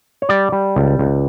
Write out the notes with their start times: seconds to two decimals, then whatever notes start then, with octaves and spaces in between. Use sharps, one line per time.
0.22 C#5
0.29 G3 D5
0.52 G3
0.76 C#2
0.99 C#2